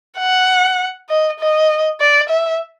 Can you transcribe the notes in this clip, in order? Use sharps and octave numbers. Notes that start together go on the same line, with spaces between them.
F#5
D#5
D#5
D5
E5